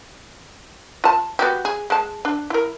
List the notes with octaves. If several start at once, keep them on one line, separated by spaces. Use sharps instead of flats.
F4 A5
B3 F#4 G4
G#4
G#3 A5
D4
E4 A#4